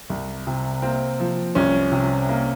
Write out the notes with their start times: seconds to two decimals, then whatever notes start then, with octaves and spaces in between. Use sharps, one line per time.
0.10 C2
0.47 C3
0.82 A#3 C4
1.20 F3
1.55 C2 C#4
1.92 C3
2.29 A#3